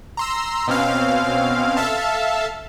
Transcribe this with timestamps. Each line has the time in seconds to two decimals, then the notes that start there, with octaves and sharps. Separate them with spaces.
0.17 A#5 C6 E6
0.67 B2 C4 C#4 F5
1.77 A4 E5 F5 A5